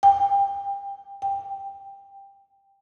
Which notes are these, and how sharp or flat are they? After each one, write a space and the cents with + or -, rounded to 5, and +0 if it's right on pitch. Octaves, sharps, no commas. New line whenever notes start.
G5 +30
G5 +15